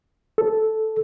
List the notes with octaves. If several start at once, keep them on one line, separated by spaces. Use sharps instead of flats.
A4